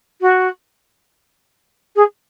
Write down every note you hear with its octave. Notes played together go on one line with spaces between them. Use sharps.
F#4
G#4